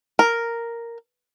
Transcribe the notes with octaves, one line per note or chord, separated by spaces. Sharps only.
A#4